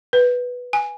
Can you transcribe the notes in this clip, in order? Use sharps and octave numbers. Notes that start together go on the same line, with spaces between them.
B4
G#5